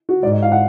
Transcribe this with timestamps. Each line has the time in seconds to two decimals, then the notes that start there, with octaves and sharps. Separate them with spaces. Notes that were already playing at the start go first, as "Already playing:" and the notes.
0.09 F#4
0.23 G#2 D5
0.32 D#5
0.42 F5
0.52 F#5